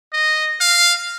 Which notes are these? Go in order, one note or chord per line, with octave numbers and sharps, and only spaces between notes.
D#5
F5